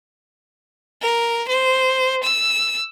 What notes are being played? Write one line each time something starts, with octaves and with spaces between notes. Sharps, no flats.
A#4
C5
E6